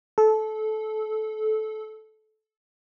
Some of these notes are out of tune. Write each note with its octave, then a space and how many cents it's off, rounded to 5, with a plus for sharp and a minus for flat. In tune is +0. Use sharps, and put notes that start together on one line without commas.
A4 -20